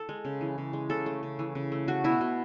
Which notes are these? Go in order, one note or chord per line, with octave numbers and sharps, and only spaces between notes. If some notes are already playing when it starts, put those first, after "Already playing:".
Already playing: A4
G#3
C#3
E3
C#3
G#3
C#3 A4
A3
C#3
E3
C#3
A3
A3 F#4
B2 E4
B2